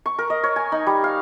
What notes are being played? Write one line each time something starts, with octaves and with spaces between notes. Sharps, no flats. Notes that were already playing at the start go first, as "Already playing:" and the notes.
C#6
A#4
D#5
C#5
G#5
D#4
G3
F5